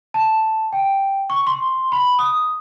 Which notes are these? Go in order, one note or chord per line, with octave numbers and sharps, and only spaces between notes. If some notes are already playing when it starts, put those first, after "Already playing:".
A5
G5
C#6
C6
B5
D#6